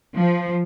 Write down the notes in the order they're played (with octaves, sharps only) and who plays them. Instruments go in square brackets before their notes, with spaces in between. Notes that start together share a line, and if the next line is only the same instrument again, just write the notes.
[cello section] F3